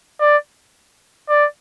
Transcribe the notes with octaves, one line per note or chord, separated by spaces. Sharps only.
D5
D5